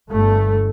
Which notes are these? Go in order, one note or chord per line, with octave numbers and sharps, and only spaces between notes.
G1 G2 A3